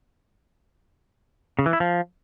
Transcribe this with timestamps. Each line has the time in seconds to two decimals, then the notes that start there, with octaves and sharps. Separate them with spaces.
1.59 C#3
1.66 E3
1.73 E4
1.80 F3